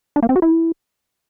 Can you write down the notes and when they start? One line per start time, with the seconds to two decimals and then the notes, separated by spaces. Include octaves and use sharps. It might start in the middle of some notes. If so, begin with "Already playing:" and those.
0.16 D4
0.23 A#3
0.29 C4
0.36 F#4
0.42 E4